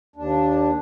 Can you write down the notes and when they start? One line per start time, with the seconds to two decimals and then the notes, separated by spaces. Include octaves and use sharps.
0.16 D#2 D4